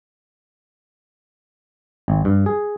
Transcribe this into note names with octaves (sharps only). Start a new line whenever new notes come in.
G#1
G2
G#4